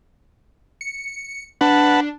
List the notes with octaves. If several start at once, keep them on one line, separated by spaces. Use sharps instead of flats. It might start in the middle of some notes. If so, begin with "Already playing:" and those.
C#7
D4 B4 F#5 A5